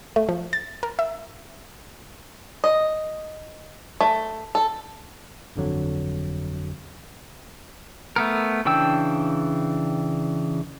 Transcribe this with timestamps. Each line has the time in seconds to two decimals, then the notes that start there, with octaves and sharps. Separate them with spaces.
0.16 A3
0.29 F3
0.53 A6
0.83 A#4
0.99 E5
2.64 D#5
4.01 A3
4.55 A4
5.56 G1 F2 D3 F#3
8.16 A3 B3 A#4
8.65 C#3 E3 D4 G5 E6